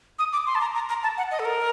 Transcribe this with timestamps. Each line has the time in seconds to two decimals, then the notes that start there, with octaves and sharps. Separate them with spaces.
0.19 D#6
0.33 D6
0.47 C6
0.55 A5
0.61 A#5
0.75 A#5
0.89 A#5
1.03 A5
1.17 F#5
1.31 D#5
1.39 A4
1.45 A#4